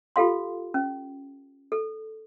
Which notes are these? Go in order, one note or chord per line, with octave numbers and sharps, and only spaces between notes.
F4 G4 A4 F5 C6
C#4
A4